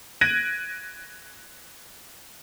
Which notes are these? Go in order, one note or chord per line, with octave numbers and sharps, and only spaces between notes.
F#6 G#6 A#6 D7 D#7 F#7